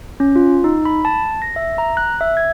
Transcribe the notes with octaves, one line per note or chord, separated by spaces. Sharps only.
C#4
F4
D#4
B5
A5
A#6
E5
A#5
F#6
E5
G#6